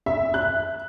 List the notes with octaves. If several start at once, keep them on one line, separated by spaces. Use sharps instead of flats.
E5
F#6